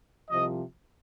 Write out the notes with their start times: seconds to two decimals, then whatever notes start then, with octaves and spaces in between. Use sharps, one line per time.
0.30 C2 C3 F3 D#5